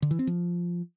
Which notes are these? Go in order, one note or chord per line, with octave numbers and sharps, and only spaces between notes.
D3
E3
C4
F3